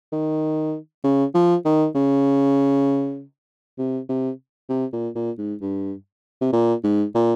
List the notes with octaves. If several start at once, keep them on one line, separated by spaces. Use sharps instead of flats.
D#3
C#3
F3
D#3
C#3
C3
C3
C3
A#2
A#2
G#2
G2
C3
A#2
G#2
A#2